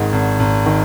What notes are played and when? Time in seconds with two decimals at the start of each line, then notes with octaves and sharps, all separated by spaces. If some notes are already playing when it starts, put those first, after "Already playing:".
Already playing: G#1 G#2 D#3
0.13 G#1
0.40 G#1
0.66 D#3